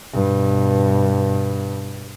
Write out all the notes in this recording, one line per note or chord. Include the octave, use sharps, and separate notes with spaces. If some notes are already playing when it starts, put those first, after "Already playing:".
G2 B2